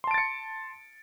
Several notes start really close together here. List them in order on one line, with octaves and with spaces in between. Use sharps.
C6 A5 D7 A6 C#7